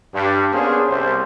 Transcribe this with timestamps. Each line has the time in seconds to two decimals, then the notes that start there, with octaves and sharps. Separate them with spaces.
0.14 G2
0.53 A#3 B3 C#4 D4 G#4 C5
0.89 C2 G3 C5